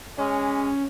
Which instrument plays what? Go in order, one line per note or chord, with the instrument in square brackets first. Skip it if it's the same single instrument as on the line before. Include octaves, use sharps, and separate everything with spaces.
[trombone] G#3 [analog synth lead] C#4